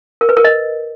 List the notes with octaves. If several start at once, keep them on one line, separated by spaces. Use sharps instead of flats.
A#4
B4
A#4
D#5